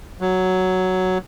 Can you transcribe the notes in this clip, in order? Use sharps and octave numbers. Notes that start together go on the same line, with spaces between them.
F#3